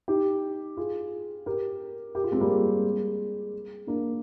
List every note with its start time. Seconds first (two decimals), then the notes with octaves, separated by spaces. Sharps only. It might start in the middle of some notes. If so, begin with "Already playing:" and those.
0.08 D#4 G4
0.77 F4 G#4
1.46 G4 A#4
2.15 G4 A#4
2.24 F4 G#4
2.32 G#3 C4
2.41 G3 A#3
2.49 G#3
3.87 A#3 D4